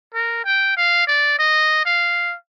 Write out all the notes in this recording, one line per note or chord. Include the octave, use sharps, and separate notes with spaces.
A#4
G5
F5
D5
D#5
F5